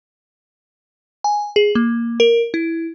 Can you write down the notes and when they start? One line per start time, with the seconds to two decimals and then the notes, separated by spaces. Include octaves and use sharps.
1.24 G#5
1.56 G#4
1.75 A#3
2.20 A#4
2.54 E4